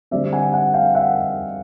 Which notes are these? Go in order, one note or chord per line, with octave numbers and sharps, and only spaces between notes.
D3 G3 C4 D5 E5
F#5 G#5
F#5 G#5
F5 G5
E5 F#5